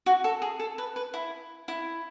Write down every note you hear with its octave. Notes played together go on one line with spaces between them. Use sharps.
F#4
A4
G#4
A4
B4
B4
E4
E4